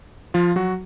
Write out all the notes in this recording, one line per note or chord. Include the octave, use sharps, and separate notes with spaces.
F3 F4
F#3 F#4